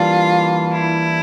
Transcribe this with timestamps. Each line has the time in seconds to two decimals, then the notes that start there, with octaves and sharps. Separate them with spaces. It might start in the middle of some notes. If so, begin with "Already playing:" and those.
Already playing: E3 G3 A#3 D4 F4
0.72 E4